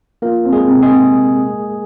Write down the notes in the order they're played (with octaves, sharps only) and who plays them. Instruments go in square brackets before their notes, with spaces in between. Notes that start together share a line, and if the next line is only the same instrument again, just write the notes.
[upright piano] F3 [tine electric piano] A#3 A#4
[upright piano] C4
[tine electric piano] G#3 G#4
[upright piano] C3
[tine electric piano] G#3 G#4
[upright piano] C3